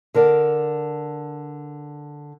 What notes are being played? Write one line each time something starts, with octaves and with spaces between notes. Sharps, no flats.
D3 A#4 D5